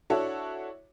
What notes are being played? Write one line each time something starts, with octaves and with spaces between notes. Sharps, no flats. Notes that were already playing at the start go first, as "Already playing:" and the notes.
D4 E4 F#4 A4 C#5